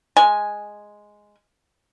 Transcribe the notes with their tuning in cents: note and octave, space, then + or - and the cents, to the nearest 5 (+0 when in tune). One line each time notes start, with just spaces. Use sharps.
G#3 +0 G#5 +0